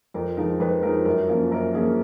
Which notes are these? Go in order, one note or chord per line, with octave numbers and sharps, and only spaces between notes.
F2 A#4
F3 G#3 D#4 A#4
F2 B4
F3 G#3 D#4 A#4
F#2 A#4
F3 A#3 C#4
F#2 A#4
F3 A#3 C#4 G#4